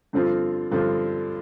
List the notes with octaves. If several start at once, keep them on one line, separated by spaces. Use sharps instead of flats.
G2 D3 F3 C4 F4
G2 D3 F3 C4 F4